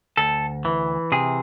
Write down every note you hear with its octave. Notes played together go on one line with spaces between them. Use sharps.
D2 A4
E3
C3 G#4